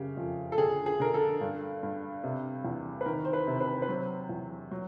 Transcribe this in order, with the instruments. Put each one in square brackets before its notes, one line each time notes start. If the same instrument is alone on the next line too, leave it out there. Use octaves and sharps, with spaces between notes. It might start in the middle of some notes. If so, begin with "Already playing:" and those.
Already playing: [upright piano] F#2 C#3 G4
F2
A4
D3 G#4
G#4
D3 A#4
A4
G2
G2
C3
E2
B4
D#3 A#4
C5
B4
C3
B4
B4
F#3 C5
E2
F#3